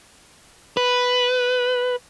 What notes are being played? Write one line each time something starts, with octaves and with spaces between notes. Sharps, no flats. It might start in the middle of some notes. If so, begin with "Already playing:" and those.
B4